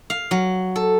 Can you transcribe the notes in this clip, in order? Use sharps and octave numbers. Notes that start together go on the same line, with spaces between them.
F5
F#3
A4